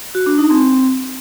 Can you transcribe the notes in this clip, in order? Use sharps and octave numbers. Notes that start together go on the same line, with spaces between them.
F#4
D4
D#4
C4